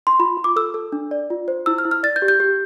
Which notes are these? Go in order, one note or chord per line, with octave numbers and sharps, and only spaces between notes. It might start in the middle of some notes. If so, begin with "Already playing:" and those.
C6
F4 B5
F4
D6
A4 E6
A4
D4
D5
F4
C5
E4 E6
F6
E4
F6
D5 A6
G6
G4
G6
G4